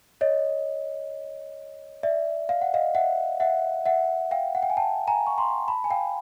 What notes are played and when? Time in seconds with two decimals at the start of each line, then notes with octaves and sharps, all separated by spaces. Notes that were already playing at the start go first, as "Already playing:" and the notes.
0.21 C#5 D#5
2.03 D5 E5
2.49 F5
2.62 F#5
2.74 D#5 F5
2.95 E5 F#5
3.40 E5 F#5
3.86 E5 F#5
4.31 F5 G5
4.55 F#5
4.63 G5
4.70 G#5
4.77 G5 A5
5.07 G#5 A#5
5.27 C#6
5.38 A#5 C6
5.68 A5 B5
5.84 G#5
5.91 F5 G5